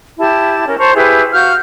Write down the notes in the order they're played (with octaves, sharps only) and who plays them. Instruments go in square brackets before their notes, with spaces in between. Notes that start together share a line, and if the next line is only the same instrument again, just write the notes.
[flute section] E4 G4 A5
C#4 A#4
C5 A5 A#5 C#6
E4 G4 G#4 B4
F#4 F5 F6 G6